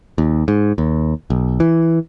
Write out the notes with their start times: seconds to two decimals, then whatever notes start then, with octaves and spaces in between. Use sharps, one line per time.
0.18 D#2
0.48 G#2
0.78 D#2
1.30 B1
1.60 E3